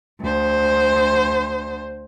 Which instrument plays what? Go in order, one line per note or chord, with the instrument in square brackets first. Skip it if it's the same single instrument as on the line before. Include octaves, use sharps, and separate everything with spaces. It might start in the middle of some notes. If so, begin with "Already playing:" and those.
[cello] D2 C5